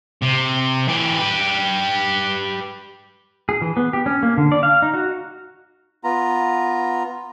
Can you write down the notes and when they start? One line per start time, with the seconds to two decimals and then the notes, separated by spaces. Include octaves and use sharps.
0.22 C3
0.88 E3 G4
1.17 G4 B4
3.49 G#4
3.62 E3
3.77 B3
3.93 G4
4.06 C#4
4.23 A#3
4.37 D3
4.52 D5
4.63 F5
4.82 D#4
4.94 F#4
6.04 B3 F4 A#5